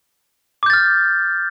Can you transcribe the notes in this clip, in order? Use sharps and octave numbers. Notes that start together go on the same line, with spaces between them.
D6 F6 G6 A6